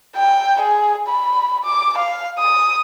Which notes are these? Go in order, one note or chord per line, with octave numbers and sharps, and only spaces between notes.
G5
G#4
B5
D6
F5
D#6